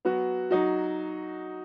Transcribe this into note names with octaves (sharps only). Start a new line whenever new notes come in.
F#3 B3 F#4
F#3 D#4 F#4